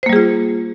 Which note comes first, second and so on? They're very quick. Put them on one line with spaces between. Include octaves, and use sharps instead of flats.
C5 A#3 G3 G#4 F4